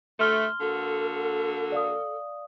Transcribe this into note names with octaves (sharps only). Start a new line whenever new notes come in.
D2 A3 C6 F6 G7
D3 A#3 F#4 A4
D5 F5 D#6